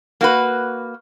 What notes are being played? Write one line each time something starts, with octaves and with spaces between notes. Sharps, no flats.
A#3 F#4 B4